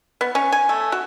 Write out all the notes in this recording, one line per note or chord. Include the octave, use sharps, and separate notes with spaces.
B3
C#4
G#5
A3
F#4